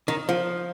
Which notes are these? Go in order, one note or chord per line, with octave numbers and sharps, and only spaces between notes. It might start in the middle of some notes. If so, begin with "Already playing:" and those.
D#3
F3